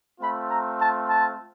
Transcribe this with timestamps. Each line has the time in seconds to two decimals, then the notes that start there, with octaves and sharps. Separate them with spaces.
0.20 A3 C4 F4 B5
0.50 A#5
0.78 A5
1.07 A5